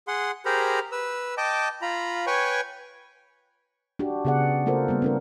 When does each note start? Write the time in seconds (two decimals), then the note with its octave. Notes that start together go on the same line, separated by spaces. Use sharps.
0.08 G#4 F#5 C6
0.45 G4 G#4 A#4 C5 A#5 B5
0.92 B4 E6
1.37 D#5 G5 A5 D6
1.82 F4 A#5 B5
2.27 B4 C#5 G5 G#5 C#6
3.99 D4 F#4 G4
4.25 C#3 B3 G#4 D5 F#5
4.66 A3 A#3 F4 A4 A#4 C5
4.88 G3 A#3 B3
5.02 C4 D4 A#4